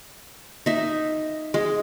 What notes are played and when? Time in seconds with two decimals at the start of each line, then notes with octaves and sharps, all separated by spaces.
0.66 D#4 E5
1.54 G#3